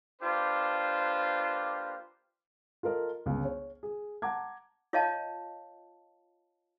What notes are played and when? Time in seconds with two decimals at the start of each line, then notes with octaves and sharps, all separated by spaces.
0.22 A#3 D4 F4 G4 B4 C5
2.83 F4 A4 A#4 D#5
3.26 G1 C#2 C#3
3.45 C#5
3.83 G#4
4.22 F#5 A5 A#5 D6 G#6
4.93 F4 C#5 D#5 F5 A5